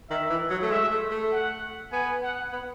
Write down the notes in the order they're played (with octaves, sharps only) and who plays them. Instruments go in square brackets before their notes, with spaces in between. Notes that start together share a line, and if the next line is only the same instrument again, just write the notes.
[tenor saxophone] D#3 [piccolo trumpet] E5
[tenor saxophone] E3
F#3
A3
[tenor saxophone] G#3 [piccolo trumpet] E5
[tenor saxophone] A3
A3
[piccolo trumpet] F#5
[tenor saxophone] B3 [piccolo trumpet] G#5
[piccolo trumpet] F#5
[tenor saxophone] B3